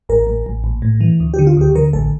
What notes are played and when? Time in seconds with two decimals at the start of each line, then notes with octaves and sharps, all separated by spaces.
0.09 A1 A#4
0.27 A1
0.46 A1
0.64 A#1
0.82 A2
1.01 E3
1.20 D2
1.34 G4
1.39 D3
1.47 F4
1.57 D2 G4
1.75 D3 A#4
1.93 A1 A4